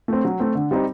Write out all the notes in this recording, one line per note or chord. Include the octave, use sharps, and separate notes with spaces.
A3 C4
F#3
A3 C4
D3
G3 C4 D#4